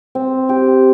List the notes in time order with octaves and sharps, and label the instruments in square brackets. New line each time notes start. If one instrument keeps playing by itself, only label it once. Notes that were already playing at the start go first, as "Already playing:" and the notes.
[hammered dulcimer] C4
G4